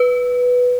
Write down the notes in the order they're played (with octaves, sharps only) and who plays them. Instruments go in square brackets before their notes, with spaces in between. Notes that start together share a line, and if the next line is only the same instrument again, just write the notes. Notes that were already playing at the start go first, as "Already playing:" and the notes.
Already playing: [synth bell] B4